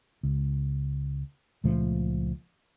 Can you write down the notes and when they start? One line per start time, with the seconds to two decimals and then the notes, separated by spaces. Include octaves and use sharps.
0.23 C#2
1.64 C#2 A#2 F3 A3